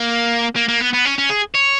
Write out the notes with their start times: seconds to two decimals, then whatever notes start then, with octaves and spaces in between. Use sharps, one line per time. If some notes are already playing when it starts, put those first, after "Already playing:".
Already playing: A#3
0.56 A#3
0.68 A#3
0.81 B3
0.93 B3
1.05 C#4
1.18 C#4
1.30 G#4
1.54 C#5